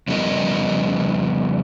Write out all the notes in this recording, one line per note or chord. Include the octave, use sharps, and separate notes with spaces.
F2 C#3 G3 B3 A#4 D#5